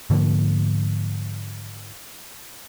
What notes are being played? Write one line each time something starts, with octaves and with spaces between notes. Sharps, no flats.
G#2 D3 F3 A#3